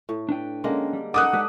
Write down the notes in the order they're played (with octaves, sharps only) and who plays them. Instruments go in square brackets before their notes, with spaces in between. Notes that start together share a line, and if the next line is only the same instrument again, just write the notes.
[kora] A2
[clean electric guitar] D4 B4 G5
[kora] D3 G#3 A#3 [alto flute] C#4
[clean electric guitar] G3
[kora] D#4 A4 [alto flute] F#5 [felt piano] D6 D#6 F#6
[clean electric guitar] G#3 G4 B4 [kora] D4